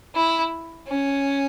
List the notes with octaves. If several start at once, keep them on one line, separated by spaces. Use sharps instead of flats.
E4
C#4